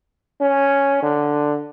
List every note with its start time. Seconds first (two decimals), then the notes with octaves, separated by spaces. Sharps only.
0.41 C#4
1.03 D3